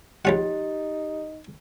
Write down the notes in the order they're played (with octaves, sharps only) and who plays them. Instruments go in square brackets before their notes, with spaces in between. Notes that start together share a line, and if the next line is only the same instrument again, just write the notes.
[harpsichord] A#1 C#4 F#5 [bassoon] D#4 [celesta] G4 A6